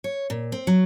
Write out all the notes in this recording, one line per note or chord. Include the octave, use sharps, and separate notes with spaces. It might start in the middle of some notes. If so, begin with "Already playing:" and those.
C#5
A#2
C4
F#3